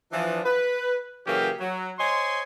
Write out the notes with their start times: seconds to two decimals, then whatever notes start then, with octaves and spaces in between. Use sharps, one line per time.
0.12 E3 F3 D4
0.45 B4
1.27 C#3 E3 F#3 A#3 C#4 G4
1.60 F#3
1.99 C5 C#5 D#5 G#5 C6